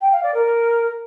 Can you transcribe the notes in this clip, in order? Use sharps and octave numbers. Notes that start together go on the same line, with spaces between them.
G5
F5
D5
A#4